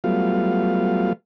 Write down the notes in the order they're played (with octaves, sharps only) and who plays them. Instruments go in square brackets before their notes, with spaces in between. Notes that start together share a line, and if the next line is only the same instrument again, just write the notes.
[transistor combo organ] F#3 G3 A3 B3 F4 F5